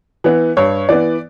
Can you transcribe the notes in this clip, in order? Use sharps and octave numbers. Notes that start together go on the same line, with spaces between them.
E3 B3
G2 C#5
E3 B3 D5